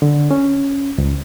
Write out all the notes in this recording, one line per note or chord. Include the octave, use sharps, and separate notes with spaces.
D3
C#4
C#2